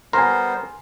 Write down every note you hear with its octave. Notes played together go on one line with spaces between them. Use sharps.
G3 B3 A#4 C5 G#5 C6